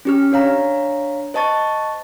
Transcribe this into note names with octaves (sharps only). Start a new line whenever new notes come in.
C#4 G4 F6
D4 C#5 F5 A#5
C5 D#5 A5 C#6 A6